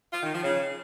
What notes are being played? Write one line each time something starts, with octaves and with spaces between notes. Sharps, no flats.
F4
D#3
F3
C#3